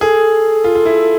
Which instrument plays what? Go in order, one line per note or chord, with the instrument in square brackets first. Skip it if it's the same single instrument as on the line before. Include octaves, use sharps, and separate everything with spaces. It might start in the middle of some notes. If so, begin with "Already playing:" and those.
[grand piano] G#4 [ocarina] A4
[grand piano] F4
F4
E4